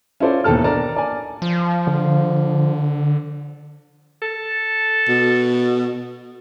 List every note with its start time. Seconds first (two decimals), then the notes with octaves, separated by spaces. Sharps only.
0.20 C#4 E4 F4 A4 C5 D5
0.44 E1 D#2 B2 A4 A5 F6
0.64 D4 A#4 D5 A5 A#5
0.96 D5 G#5
1.42 F3
1.87 D3
4.22 A4
5.09 B2